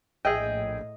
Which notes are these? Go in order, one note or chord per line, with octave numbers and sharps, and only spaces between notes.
A#1 A2 G#4 D#5 E5 G5